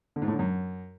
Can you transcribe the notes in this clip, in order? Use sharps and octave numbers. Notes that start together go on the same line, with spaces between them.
D3
G#2
A2
D3
F#2